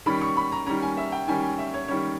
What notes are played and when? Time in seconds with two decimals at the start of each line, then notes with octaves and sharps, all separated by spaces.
0.06 D#3 G3 C#4 B5
0.21 C#6
0.37 B5
0.52 A#5
0.66 D#3 G3 C#4 A#5
0.82 G#5
0.97 E5
1.12 G5
1.28 D#3 G3 C#4 G#5
1.43 G#5
1.58 E5
1.74 C#5
1.88 D#3 G3 C#4 C#5